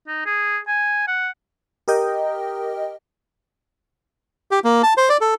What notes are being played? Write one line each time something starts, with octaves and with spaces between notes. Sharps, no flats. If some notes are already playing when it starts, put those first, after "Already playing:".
D#4
G#4
G#5
F#5
G4 A#4 D#5 G5
G4
A#3
A5
C5
D5
A4